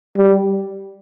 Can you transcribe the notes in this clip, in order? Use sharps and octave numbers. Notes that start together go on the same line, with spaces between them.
G3